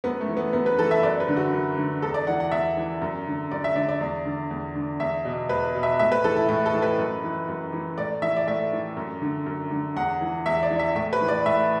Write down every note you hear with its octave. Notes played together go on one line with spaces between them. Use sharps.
F#2 B3
A3
E3
B3
F#2 B3
B4
E3 A4
E5
F#2 D5
B4
D3
F#4
F#2
D3
E2 A4
D5
E3 F#5
F#5
E2 E5
E3
F#2
D3
F#2 D5
E5
D3 D5
D5
E2
D3
E2
D3
E2 E5
B2
E2 B4
B2
E5
A2 E5
B4
E3 A4
E4
A2 E4
A4
E3
B4
F#2
E3
F#2
E3
A2 D5
E3 E5
D5
A2 E5
E3
F#2
D3
F#2
D3
E2 F#5
E3
E2 E5
D5
E3
E5
A2 E5
B4
E3
D5
A2 E5